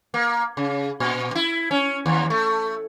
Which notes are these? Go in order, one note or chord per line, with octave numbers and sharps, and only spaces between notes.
A#3
C#3
A#2
E4
C#4
D#2
A3